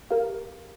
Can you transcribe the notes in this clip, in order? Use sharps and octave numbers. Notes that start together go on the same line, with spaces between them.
G4 A#4 F5